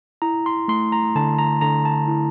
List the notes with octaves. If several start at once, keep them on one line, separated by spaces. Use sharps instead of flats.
E4 A#5
C6
A3 C6
A#5
D3 A5
A#5
D3 A#5
A5
E4